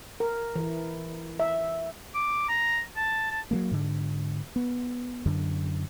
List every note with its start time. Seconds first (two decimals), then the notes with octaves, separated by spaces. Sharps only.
0.20 A#4
0.56 E3
1.40 E5
2.14 D6
2.48 A#5
2.96 A5
3.31 A5
3.51 F#3 G3 A#3
3.71 G#2 D3
4.56 B3
5.26 F#2 D3